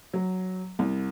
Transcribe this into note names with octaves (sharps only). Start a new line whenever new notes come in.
F#3
C2